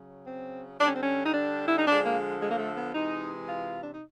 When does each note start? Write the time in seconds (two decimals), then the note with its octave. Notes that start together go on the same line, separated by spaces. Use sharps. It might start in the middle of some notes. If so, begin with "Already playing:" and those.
Already playing: C#3 F#3
0.26 C4
0.79 D3 G3 D4
0.88 C#4
0.96 C4
1.03 C#4
1.25 D#4
1.34 D4
1.68 E4
1.78 D#4
1.87 D3 F3 G#3 D4
2.05 A#3
2.42 G#3
2.50 A#3
2.59 A3
2.77 B3
2.95 C3 E3 G#3 D#4
3.48 F4
3.83 D4
3.93 D#4